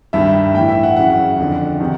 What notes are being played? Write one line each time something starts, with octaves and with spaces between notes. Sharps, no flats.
G2 D#3 E5
A2 E3 G5
E5
F#5
F#2 C#3 E3 F#5
F2 D3
C3 D#3